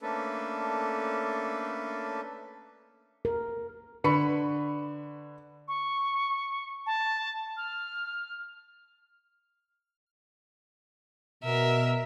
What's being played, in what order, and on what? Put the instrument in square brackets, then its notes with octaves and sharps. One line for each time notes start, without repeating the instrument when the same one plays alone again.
[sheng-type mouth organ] A3 A#3 C#4 D4 A4 B4
[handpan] A#4
[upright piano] D3 B4 B5 C#6 C#7
[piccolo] C#6
A5
F6
[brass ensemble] B2 [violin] A#4 E5